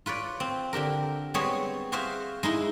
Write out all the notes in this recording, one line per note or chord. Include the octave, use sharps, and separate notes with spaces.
F4 B4 C#5 D5
C4
D3 D4 G4 A#4
G3 G#3 B3 C4 G#4 C#5
F#4 G#4 C5 E5 F5
G#3 D#4 E4